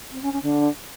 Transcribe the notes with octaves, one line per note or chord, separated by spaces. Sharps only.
C4
C#4
C#4
D3